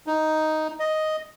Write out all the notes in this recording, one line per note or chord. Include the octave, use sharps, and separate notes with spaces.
D#4
D#5